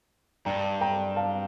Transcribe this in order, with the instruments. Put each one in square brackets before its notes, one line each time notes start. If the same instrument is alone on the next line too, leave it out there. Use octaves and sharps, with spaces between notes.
[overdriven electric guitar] G2 [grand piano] G5 A#5
[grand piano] G5 A#5
F5 A5